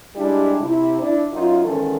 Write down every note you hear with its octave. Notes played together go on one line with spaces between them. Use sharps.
G3 G#3 D4 E4 G4
C3 E4
D4 E4
F#2 D#4 F4
E2 D#3 G#3 C#4 A4